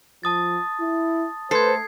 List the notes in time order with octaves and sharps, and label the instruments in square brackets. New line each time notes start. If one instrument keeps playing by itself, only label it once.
[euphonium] F3 [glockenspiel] A5 D#6 A6
[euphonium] E4
[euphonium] A3 [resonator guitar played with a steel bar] A4 [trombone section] B4 C5 [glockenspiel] G#6 C7